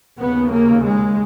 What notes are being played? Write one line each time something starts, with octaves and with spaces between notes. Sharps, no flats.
D#2 C#3 B3
A#3
G#3